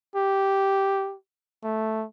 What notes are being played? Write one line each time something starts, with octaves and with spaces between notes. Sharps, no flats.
G4
A3